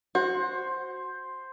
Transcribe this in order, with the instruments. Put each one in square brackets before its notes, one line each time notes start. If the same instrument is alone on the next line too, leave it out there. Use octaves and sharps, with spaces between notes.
[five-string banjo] F#4 [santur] C5